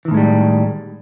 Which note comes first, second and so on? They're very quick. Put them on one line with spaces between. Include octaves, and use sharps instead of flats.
E3 D#3 A2 G#3 G3